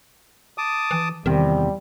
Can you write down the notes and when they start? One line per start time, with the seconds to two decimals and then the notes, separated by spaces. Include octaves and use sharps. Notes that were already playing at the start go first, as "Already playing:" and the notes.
0.58 A5 D6 D#6
0.91 E3
1.26 E2 C3 D#3 F3 G3